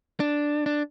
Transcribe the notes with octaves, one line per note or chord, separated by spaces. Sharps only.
D4
D4